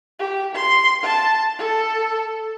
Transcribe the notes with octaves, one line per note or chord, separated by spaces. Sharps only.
G4
C6
A5
A4